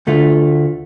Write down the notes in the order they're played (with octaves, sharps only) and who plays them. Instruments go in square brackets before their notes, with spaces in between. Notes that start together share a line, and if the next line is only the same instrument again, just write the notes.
[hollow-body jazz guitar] D2 D3 A3 F4